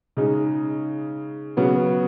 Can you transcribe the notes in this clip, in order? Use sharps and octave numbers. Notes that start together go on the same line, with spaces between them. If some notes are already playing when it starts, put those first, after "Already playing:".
C#3 G#3 D#4
C#3 F#3 B3 F#4